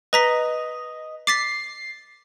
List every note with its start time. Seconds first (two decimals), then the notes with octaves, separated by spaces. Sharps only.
0.13 B4 D#5 A#5 B6
1.27 D6 A6 B6 C7